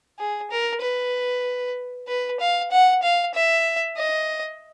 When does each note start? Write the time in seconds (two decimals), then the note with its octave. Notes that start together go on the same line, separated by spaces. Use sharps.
0.19 G#4
0.51 A#4
0.81 B4
2.08 B4
2.40 F5
2.71 F#5
3.03 F5
3.34 E5
3.97 D#5